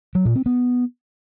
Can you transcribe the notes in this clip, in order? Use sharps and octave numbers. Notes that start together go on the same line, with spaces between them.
F#3
A#2
C4
B3